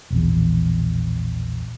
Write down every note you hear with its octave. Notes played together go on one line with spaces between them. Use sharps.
E1 A#1 E2